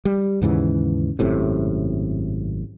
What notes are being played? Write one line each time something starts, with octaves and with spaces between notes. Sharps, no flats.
G3
D#2 G#2 C#3 E3
G#1 F#2 A2 C3